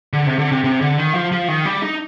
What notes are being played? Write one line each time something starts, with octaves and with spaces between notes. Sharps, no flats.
D3
C3
D3
C3
C3
D3
D#3
F3
F3
D#3
G3
D#4